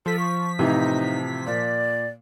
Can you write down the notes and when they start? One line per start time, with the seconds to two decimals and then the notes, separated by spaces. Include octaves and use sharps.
0.06 F3 A4 B6
0.19 C#6
0.59 A2 C3 E3 D#4
1.46 A#2 D5